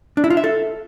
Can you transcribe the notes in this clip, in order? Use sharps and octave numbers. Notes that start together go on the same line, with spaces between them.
D4
E4
F4
E5
A4